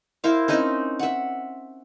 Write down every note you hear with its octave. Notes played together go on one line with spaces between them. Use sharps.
E4 A#4 C5 F5
C4 C#4 D#4 D#5
E5 F#5